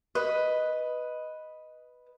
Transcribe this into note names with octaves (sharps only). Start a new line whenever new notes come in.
B4 D#5